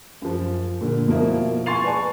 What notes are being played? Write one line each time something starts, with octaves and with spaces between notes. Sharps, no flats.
F#2 F3
A#2 D3
B2 F3 A#3 E4
G#5 C6 C#6 A6 C7 F7
B4 D5 G#5 A5 C#6